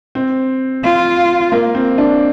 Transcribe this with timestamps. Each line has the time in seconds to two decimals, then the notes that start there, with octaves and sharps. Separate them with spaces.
0.15 C4
0.84 F4
1.52 A#3
1.75 C4
1.98 D4